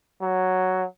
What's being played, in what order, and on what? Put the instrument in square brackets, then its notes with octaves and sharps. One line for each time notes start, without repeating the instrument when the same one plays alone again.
[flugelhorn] F#3